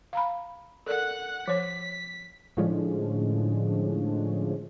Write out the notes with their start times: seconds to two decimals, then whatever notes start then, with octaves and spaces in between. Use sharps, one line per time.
0.13 F5 A#5 B5
0.86 A4 A#4 D5 F#5 F#6
1.48 F3 C5 C#5 B6
2.57 A2 D3 F3 G#3 C#4 D4